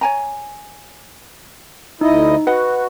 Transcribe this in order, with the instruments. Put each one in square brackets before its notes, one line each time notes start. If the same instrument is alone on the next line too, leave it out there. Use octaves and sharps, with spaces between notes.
[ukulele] C#5 G#5 A#5
[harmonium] D2 E4 D#5 [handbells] D#4
[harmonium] F#4 [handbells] B4 [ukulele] D#5 F#5